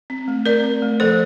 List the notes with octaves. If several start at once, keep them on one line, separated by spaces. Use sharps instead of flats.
C4
A3
C4 A#4 D5
C4
A3
F3 A4 C5